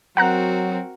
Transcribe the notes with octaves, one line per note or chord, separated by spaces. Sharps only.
F#3 C4 F#4 A#4 F#5 A#5 F#6